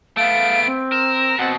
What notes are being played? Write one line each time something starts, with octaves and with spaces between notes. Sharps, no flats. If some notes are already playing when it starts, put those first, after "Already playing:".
A3 B3 F5 D7
C4
A#4 E7
B2 C4 F#5